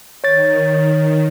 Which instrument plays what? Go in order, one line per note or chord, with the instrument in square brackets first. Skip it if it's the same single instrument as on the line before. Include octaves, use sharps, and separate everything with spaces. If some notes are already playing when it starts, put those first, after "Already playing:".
[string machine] D#3 [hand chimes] C#5 A6